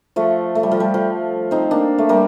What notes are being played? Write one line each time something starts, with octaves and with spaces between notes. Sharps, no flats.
F3 A3
A3
G3
F3
G3
F3
C4 D#4
A#3 D4
A3
G3 A#3